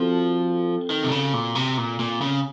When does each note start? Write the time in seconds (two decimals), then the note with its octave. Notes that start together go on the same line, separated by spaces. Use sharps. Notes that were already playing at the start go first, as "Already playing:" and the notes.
Already playing: F3 C4 F#4 A4
0.90 D#3
1.04 C3
1.11 C#3
1.33 A#2
1.55 C3
1.78 A#2
1.99 A#2
2.21 C#3